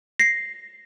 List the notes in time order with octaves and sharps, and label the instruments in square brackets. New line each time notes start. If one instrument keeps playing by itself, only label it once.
[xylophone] A#6 C7